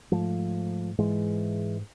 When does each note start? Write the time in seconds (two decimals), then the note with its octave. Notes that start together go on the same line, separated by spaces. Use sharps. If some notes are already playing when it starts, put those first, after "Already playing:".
0.12 G#2 F3 A3
0.98 G#2 E3 G#3